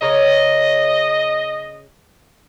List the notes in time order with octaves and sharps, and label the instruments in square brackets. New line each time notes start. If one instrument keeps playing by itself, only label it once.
[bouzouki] C#3 A#4 C#5 [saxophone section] D#5